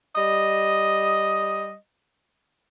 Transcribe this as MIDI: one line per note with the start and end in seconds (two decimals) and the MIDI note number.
0.16 1.74 55
0.16 1.74 75